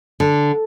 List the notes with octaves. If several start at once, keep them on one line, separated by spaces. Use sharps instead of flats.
D3